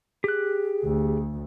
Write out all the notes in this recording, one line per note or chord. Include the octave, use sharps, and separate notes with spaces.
G4 G#4 F#6
D2